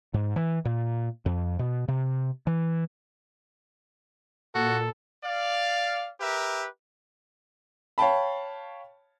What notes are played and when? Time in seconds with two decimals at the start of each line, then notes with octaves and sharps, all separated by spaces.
0.14 G#2
0.36 E3
0.65 A#2
1.26 F2
1.59 B2
1.88 C3
2.47 E3
4.55 A#2 F#4 A4
5.24 D5 F5
6.20 G4 A#4 B4 E5
7.98 C#5 F5 G5 A5 B5